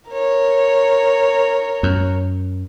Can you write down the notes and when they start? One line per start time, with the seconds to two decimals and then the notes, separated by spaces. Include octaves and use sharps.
0.10 A#4 C#5
1.83 F#2